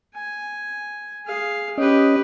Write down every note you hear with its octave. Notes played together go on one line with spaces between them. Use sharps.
G#5
G#4 F5
C#4 G4 B4 D#5